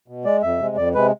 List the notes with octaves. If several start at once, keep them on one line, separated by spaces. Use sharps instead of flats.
B2
G#3 D5
F2 E5
C3 G#3
F2 D5
C3 G#3 B4